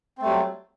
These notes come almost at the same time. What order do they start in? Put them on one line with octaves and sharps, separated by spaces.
C4 A3 G3 F#3